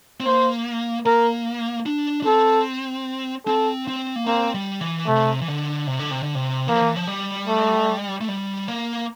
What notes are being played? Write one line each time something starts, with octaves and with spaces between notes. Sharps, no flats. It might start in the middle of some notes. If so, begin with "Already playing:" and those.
C4
A#3 C5
A#3 A#4
D4
D4
C4 A4
C4 A4
C4
A#3
A#3 C4
G3
E3
C3 A3
E3
D3
C3
D3
C3
D3
C3
E3 A#3
F3
E3
F3
G3
A3
A3
G3
A#3